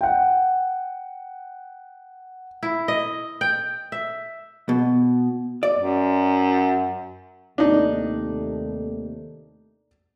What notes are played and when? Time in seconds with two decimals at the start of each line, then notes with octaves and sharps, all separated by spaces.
0.01 F#5 G5
2.63 E4
2.88 D#5
3.41 G5
3.92 E5
4.69 B2
5.63 D5
5.76 F#2
7.58 D#2 C3 A3 D4 D#4